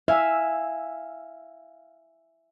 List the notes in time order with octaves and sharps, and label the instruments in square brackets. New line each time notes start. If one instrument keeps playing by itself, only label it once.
[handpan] E5 [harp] F5 G#5 E6